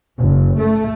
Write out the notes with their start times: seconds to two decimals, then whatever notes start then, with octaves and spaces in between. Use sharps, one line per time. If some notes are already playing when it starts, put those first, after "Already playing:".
0.19 F#1
0.57 A3